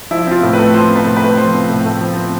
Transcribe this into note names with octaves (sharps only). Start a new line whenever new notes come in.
F3 E4
C4 F4
A2
B4
A3
F3 C5
C4
B4
A2
B4
A3
F3 C5
C4
A2
A3
F3
C4